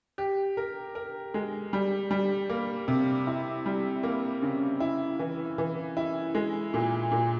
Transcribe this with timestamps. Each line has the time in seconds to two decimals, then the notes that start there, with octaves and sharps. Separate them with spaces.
0.18 G4
0.57 A#4
0.95 A#4
1.34 G#3
1.73 G3
2.11 G3
2.50 A#3
2.88 C3
3.27 E4
3.66 G3
4.03 A#3
4.42 C#3
4.80 E4
5.19 E3
5.58 E3
5.97 E4
6.35 G#3
6.74 A#2
7.11 A#2